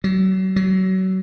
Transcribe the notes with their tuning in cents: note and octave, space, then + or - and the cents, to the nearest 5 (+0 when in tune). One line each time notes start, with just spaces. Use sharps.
F#3 +35
F#3 +30